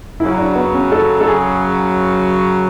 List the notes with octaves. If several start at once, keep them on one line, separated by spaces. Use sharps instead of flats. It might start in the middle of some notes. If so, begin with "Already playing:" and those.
F#2 C#3 F#3 E4
D4
B3
C#4
A4
A4
G#4